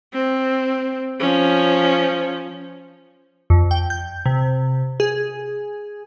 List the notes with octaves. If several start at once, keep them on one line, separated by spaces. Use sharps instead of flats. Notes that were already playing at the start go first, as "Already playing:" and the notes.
C4
F3 C#4
F2
G5
G6
C3
G#4